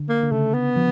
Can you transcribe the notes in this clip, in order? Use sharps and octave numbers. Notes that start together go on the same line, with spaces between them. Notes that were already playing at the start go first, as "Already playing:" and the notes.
Already playing: D3
A#3
D3
C#3 A3
B3
F3